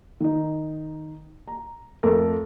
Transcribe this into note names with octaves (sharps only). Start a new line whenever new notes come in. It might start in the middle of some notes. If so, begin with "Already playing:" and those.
D#3 D#4
A#5
F2 A3 A#4